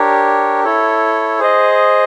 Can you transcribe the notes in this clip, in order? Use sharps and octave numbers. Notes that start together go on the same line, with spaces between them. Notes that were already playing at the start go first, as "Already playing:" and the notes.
Already playing: D4 G4 A#4 C#5
E4 A4 C#5
G#4 C5 D#5